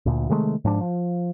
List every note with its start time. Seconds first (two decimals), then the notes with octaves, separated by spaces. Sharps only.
0.06 D2 A#2
0.29 C3 D#3 G#3 A3
0.65 G#2 F3 D4
0.81 F3